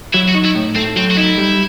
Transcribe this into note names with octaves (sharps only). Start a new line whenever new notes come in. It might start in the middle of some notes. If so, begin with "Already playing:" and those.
F#3 E4
F#4
D#4
E4
A2
A3 C4
F#3 C4
F#4
D#4 E4
G3